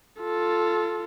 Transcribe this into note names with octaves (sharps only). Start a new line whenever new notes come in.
F4 A4